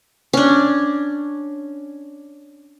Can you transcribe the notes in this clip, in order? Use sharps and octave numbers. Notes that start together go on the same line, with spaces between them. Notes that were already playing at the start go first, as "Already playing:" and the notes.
C#4 D4